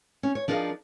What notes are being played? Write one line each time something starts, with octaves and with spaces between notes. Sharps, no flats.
C#4
C#5
F3 D4 D#4 G#4 A#4 F5